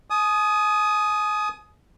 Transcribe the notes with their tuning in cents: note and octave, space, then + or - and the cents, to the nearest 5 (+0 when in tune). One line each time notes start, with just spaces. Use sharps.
G#5 +35 D#6 +0